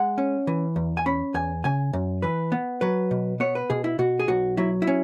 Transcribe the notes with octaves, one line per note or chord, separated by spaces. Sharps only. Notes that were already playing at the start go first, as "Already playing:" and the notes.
Already playing: G#3 F#5
C#4
E3
E2
G#5
C#4 B5
E2 G#5
C#3 G#5
F#2
E3 B4
B3
F#3 B4
B2
B3 C#5
B4
B2 G#4
E4
B2 F#4
G#4
B1 F#4
F#3 E4
E4
C#4